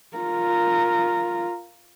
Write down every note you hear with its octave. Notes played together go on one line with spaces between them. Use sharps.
F4 A#4